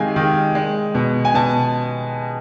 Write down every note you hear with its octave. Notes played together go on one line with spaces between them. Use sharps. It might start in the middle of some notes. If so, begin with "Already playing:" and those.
Already playing: C3 D#3 G#3 F5 G5 G#5
D#3
G#3
B2
G#5
B2 A5